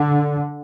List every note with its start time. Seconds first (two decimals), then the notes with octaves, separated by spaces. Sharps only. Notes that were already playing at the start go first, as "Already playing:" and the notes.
Already playing: D3